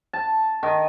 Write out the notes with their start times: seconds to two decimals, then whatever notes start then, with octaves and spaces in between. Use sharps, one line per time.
0.13 A5
0.63 D#3